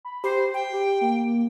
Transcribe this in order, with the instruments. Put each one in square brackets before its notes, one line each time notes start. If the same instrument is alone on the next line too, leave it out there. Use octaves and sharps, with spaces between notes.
[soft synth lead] B5
[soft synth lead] G4 [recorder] C5
[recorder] G5
[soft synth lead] G4
A#3